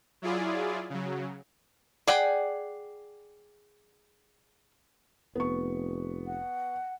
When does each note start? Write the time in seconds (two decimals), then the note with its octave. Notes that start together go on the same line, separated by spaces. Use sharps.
0.22 F#3 E4 F4 G#4 D5
0.90 C#3 F#3
2.07 G#4 D5 F#5 G5
5.35 F1 B3 C#6
6.27 F#5